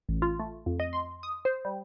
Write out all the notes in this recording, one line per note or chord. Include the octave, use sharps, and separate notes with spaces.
A1
F4
A3
F2
D#5
C6
D#6
C5
G3